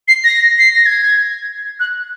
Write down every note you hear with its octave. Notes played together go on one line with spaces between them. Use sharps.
C7
A#6
C7
A#6
G#6
F#6